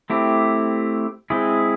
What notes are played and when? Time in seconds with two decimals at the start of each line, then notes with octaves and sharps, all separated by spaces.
0.10 A3 C4 E4 G4
1.30 G#3 C4 E4 G#4